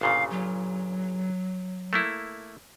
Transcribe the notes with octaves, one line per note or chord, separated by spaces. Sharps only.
G1 A#2 C#3 F5
F#3
A3 A#3 E4